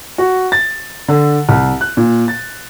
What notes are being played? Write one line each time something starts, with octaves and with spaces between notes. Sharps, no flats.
F#4
A6
D3
C2
F#6
A#2
A6